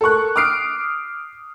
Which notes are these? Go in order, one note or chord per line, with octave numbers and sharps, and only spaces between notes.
A4 A#4 C#6 F#6
D6 D#6 F6 C7 D7